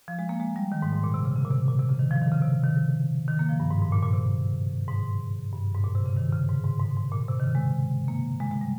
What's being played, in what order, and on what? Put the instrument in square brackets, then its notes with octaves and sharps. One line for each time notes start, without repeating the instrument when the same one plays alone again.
[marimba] F3
G#3
A#3
G#3
G3
D#3
G#2
G#2
A#2
C3
C#3
C#3
A#2
C3
A#2
C3
C#3
D#3
F3
D#3
C#3
C3
D#3
D#3
A#3
F3
G2
G#2
G#2
A#2
A#2
C3
G#2
G2
G#2
A#2
C3
C#3
D#3
C#3
G#2
G#2
G#2
G#2
A#2
C3
D#3
C#3
G#3
A#3
G#3
G#3
G3